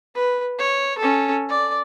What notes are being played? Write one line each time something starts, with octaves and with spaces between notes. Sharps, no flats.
B4
C#5
C#4 A4
D5